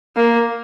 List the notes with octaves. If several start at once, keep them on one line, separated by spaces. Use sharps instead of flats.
A#3